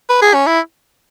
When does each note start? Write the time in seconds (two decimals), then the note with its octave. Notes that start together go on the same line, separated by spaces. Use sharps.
0.09 B4
0.22 G#4
0.34 C#4
0.46 E4